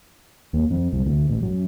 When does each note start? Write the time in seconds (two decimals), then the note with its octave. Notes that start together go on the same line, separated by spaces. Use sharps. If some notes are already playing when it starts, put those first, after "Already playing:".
0.53 D#2
0.71 F2
0.93 C2
1.06 D2
1.30 A1
1.43 F#2